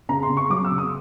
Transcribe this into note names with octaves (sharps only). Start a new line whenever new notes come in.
C#3 A#5
C6
C#3
C#6
F#3 D6
E6
C#3
D#6